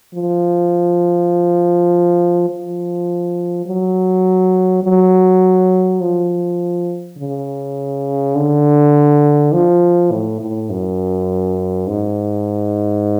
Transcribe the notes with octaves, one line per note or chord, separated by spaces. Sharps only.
F3
F3
F#3
F#3
F3
C#3
D3
F3
A2
A2
F#2
G#2